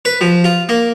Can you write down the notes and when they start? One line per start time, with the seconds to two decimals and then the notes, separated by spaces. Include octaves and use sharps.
0.05 B4
0.21 F3
0.44 F4
0.69 A#3